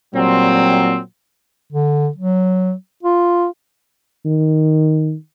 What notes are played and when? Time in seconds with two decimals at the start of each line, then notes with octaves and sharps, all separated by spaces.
0.14 A#2 F#3 G3 C4
1.73 D3
2.16 F#3
3.03 F4
4.25 D#3